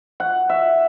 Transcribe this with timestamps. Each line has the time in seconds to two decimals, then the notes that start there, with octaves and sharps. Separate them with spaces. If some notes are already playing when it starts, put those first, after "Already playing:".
0.20 F#5
0.49 E5